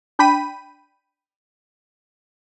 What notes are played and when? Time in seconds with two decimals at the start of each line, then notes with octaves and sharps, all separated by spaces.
0.19 D4 G5 B5 B6 D#7